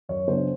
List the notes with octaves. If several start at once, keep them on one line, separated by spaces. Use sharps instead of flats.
F#2 C#5
C#3 F#3 B3 D4 C5